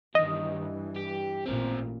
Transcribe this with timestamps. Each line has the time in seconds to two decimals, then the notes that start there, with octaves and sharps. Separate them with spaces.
0.15 E2 G2 D#3 E3 D#5
0.96 G4
1.46 A1 A#2 C4 A#4